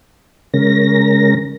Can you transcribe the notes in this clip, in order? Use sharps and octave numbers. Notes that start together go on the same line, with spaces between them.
C#3 G#3 C#4 A#4 A#6